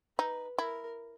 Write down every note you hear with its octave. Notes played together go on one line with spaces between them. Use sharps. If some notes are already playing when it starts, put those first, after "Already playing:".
D#4 B4
E4 A#4